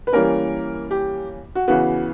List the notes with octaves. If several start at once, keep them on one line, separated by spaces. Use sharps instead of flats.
B4
E3 G3 A#3 C#4 A#4
G4
F#4
C#3 E3 B3 F#4